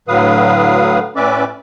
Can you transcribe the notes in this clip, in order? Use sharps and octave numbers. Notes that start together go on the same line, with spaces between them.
A2 D3 F#3 B4 F5 D#6
A2 C#4 B4 D5 E5 D6